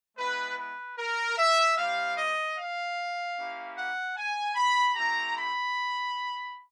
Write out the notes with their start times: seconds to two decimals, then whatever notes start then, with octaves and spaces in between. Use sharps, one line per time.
0.17 G#3 B3 E4 B4
0.57 B4
0.97 A#4
1.36 E5
1.76 G3 C4 E4 G4 F5
2.17 D#5
2.57 F5
3.36 A#3 C#4 E4 G4
3.75 F#5
4.15 G#5
4.55 B5
4.95 A3 C4 E4 G4 A#5
5.35 B5